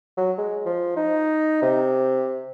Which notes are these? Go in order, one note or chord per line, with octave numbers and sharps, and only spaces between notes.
F#3
G#3
F3
D#4
C3